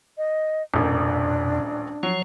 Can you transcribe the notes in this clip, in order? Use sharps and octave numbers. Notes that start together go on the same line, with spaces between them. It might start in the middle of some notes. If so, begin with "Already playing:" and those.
D#5
D#1 A1 F2 B2 A#3 D4
F3 F#3 C#5